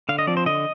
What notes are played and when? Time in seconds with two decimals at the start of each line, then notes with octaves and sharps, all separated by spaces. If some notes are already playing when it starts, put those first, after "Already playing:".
0.09 D3 F5
0.19 D#5
0.27 F3 C4 D5
0.37 C5
0.46 D3 D#5